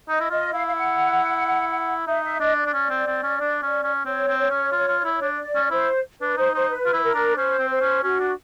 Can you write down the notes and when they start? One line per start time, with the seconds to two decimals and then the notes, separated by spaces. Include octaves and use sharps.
0.09 D#4 D#5
0.21 E4
0.30 F4 D#5
0.53 E4 F5
0.67 F5
0.75 F#5
2.07 D#4 E5
2.23 E5
2.40 D4 D#5
2.57 D5
2.66 D4
2.74 C#4
2.90 C4
3.07 C4
3.23 C#4
3.40 D4
3.62 C#4
3.83 C#4
4.05 C4 C#5
4.28 C4
4.39 C#5
4.50 C#4
4.72 F4
4.88 F4
5.05 E4
5.22 D4
5.38 D5
5.55 C#4
5.71 E4 C5
6.21 D4 B4
6.37 D#4 C5
6.54 D#4 C5
6.71 B4
6.86 F4
6.93 E4
7.04 A#4
7.14 D4
7.37 C#4 C5
7.59 C4
7.70 C5
7.81 C#4
8.03 C#4 F#4
8.20 D4